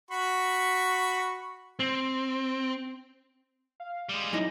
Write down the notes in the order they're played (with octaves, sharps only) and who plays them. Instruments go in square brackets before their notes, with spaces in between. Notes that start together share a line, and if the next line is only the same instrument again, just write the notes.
[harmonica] F#4 B5 C#6
[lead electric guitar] C4
[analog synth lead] F5
[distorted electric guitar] G3 G#3
[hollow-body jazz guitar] F#2 D#4 [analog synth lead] E4